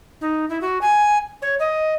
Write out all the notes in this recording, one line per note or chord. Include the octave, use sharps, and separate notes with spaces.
D#4
E4
F#4
G#5
C#5
D#5